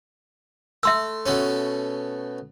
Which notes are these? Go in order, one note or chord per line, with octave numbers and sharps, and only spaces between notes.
A3 E5 C6 E6
B2 A3 C#4